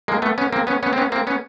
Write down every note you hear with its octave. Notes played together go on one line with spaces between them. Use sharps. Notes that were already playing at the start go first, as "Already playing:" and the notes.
G#3 A#3
A3 B3
B3 C#4
A#3 C4
B3 C#4
B3 C#4
C4
B3 C#4
A#3 C4
B3 C#4